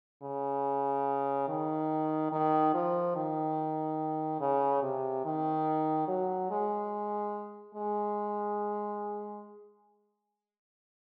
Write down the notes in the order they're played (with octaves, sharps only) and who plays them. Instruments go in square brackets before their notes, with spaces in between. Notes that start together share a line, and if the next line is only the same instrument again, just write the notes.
[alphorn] C#3
D#3
D#3
F3
D#3
C#3
C3
D#3
F#3
G#3
G#3